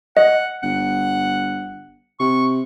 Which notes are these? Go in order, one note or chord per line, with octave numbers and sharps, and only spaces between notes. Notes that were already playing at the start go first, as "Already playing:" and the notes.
D#5 F#5
G1 F#5
C3 C#6